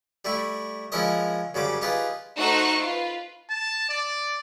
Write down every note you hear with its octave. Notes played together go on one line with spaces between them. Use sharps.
G3 A3 E4 C#6
F3 G#3 C#4 E4 A#4 D#5
F#2 C#3 G3 C5 D6
D#4 F4 G4 G#4 B4
A3 D#4 F#4 C5 C#6 F#6
F4 B4
A5
D5